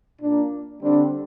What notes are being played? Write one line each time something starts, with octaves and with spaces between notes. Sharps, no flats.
A#2 D4
A#3
D3 G3 C4 D4